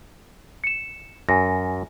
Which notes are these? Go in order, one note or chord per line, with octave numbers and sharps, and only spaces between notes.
C#7 E7
F#2 G#5 A#6